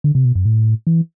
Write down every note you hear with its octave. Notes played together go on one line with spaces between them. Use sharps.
D3
C3
B2
F#2
A2
E3